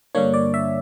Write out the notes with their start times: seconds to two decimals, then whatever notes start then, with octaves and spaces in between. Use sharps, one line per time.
0.15 G2 D3 A#3 D4 C#5
0.34 D5
0.54 E5